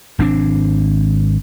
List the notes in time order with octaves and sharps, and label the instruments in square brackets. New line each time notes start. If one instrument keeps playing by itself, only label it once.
[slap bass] G#1 C4 D4